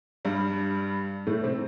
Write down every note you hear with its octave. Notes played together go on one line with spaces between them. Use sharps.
G2 G3
A2 A3
C3 C4